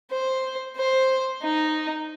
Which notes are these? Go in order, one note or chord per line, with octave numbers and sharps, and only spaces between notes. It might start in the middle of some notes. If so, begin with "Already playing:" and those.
C5
C5
D#4